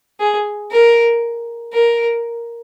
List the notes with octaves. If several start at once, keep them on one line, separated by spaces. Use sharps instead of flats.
G#4
A#4
A#4